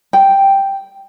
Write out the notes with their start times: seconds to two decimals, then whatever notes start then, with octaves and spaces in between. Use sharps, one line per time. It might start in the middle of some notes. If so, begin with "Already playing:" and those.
0.13 G5